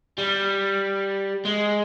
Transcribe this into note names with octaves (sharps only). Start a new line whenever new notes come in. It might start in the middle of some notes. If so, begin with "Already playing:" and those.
G3
G#3